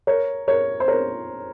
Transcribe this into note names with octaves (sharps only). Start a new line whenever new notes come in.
A#4 C#5
A#4 C#5
C5
A#4 C#5